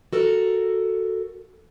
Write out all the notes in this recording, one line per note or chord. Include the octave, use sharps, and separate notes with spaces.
F#4 A4 A#4